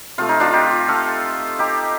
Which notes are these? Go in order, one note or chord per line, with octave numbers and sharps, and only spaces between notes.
C3 F3 A3 F4
D#4
D4 F4
D#4 G4
F4 A4
D#4 G4